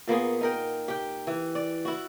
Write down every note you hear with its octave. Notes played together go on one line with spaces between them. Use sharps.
A#2 A#3 B3 G#4
D#4 A#4 G5
G4 G5
E3
D5
E4 F#4